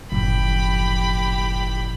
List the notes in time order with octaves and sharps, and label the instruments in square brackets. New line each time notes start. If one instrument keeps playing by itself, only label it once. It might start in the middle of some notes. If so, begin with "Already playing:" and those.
[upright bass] F#1 F3 [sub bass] A2 [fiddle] G4 B5